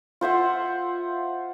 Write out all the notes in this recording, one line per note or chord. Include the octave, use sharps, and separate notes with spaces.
F4 C5 E5 F#5